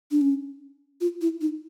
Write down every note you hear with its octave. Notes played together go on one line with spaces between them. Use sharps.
D4
C#4
F4
E4
D#4